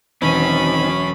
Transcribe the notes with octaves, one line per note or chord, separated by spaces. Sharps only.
E1 D#3 F#3 C4 C#4 B5